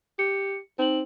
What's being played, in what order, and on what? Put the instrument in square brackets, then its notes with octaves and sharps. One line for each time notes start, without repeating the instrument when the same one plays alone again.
[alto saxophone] G4 [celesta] C#7
[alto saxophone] C4 [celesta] D#4 F#7